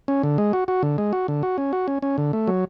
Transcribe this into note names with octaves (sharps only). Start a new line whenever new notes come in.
C#4
D3
G#3
F#4
F#4
D3
G#3
F#4
D3
F#4
C#4
F#4
C#4
C#4
D3
A3
F#3